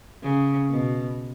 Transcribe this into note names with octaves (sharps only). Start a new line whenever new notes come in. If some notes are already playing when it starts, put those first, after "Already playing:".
C#3
B2